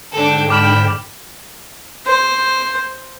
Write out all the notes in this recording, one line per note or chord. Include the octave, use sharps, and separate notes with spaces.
G#2 D3 D4 A4 G5
B5 D6 F6 E7
C5